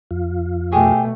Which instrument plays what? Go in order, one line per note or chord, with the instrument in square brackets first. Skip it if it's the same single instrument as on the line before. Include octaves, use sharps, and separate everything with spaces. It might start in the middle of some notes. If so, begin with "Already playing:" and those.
[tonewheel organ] F2 F4
[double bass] B2 A3 [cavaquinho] G4 G#4 C#5